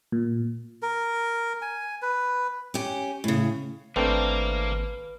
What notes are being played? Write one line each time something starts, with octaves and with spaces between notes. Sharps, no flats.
A#2
A#4
G#5
B4
C#4 G4
A2 C#3
G#1 A3 A#3 C4 D4 B4